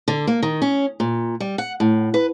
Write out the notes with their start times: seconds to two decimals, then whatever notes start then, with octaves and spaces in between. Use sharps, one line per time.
0.08 D3
0.27 A#3
0.43 D#3
0.62 C#4
1.00 A#2
1.40 G3
1.58 F#5
1.80 A2
2.14 B4